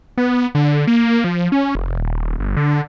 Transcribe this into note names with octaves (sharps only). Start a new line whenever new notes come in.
B3
D3
A#3
F3
C#4
F1
D#1
G1
D3